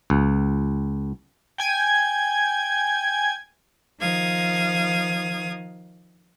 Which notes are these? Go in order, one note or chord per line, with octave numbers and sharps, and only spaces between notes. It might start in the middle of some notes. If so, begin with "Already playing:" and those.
C#2
G5 G#5 G#6
D#3 F3 F5 D#6 G#6